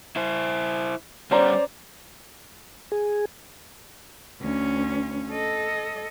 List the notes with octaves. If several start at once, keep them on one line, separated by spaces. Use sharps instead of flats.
E4 C5
G3 B3 C#4 C5 D5 A#5 D6
G#4
D2 C#4
A4 D#5